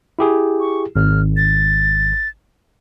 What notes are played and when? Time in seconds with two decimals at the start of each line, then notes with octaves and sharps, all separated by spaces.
0.19 E4 G4 G#4
0.60 C#6
0.96 G#1 F6
1.37 A6